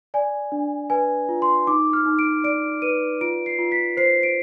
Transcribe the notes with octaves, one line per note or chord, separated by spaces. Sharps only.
D5 G#5
D4
B4 G#5
F4
C6
D#4 D6
F6
D#4
D7
D5 D7
B4 D#7
F4 D7
C7
F4
B6
C5 C7
D7